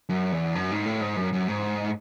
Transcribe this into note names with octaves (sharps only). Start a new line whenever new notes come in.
F#2
E2
F#2
G#2
A2
G#2
F#2
F#2
G#2